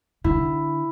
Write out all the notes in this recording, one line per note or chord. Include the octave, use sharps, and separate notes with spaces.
D3 E4